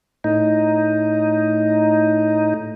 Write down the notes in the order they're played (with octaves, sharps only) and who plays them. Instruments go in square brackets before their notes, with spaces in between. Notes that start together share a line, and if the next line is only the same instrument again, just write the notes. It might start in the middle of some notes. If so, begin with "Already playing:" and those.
[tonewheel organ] A2 D#4